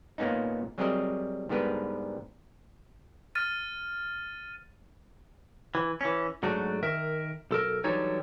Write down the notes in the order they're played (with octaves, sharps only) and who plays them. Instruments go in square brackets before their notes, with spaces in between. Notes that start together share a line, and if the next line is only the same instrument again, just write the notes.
[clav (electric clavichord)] A#2 A#3 B3 C#4 D#4
F#3 G3 C4 G#4 A#4 D#5
G#2 D3 G3 B3 A#4 B4
[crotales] F6 A6 D#7
[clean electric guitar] E3
E3 C#4
G#2 F#3 A3 D4 F#4
D#3 A#4 E5
B1 A4 A#4
D3 E3 F#3 G3 D#4 C#5